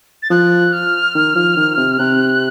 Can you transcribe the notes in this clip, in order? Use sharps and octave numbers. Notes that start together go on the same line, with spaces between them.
A6
F3 F#6
F6
D#3
F3
D#3
C3
C3 F#6